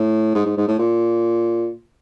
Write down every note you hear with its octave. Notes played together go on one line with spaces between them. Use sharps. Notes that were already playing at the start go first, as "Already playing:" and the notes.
Already playing: A2
G#2
G#2
G#2
A2
A#2